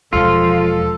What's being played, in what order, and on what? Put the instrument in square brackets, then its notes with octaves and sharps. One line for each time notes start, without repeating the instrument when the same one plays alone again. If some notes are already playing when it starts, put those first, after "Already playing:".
[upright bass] E1 E2 [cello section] F3 G#3 [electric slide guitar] F4 [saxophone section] A4